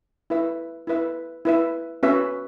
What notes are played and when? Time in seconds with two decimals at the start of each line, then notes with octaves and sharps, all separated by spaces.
0.30 E4 B4 E5
0.87 E4 B4 E5
1.45 E4 B4 E5
2.03 C#4 F#4 B4 E5